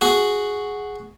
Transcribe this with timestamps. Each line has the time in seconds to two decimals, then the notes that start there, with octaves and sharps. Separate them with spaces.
0.01 F#4 G#4